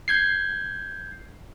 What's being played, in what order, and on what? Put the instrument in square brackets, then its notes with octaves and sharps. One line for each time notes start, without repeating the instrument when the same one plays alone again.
[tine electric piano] G6 G#6 C7